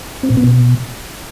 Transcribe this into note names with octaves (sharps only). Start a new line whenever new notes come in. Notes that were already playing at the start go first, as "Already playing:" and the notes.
C4
A#2
B3
B2